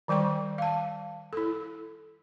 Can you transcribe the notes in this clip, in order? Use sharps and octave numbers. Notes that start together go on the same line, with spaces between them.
D#3 G3 C5 G5 C#6
F5 A5
E4 A4